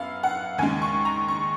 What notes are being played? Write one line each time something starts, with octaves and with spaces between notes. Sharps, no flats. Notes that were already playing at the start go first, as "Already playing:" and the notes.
Already playing: F#2 B3 F5
F#5
D#2 C#3 G#3 G#5
C#6
A#5
C#6